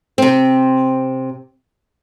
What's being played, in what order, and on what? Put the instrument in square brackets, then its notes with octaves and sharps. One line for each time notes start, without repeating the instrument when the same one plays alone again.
[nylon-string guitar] C3 C4